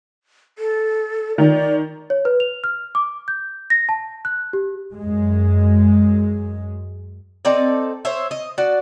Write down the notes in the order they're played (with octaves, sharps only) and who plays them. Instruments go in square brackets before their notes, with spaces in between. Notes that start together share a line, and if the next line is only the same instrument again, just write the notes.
[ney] A4
[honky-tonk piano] D#3 [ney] D5
[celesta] C#5
B4
F7
F6
D6
G6
A#6
A5
F#6
G4
[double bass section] F#2 G#3
[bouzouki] C4 D#4 A4 D5
C5 C#5 E5
D#5
F#4 D5